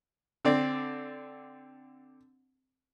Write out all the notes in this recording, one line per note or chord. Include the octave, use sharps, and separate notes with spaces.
D3 C4 D5